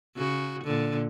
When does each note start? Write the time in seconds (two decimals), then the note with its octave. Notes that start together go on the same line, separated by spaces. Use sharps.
0.16 C#3 F#4
0.64 A#2 D3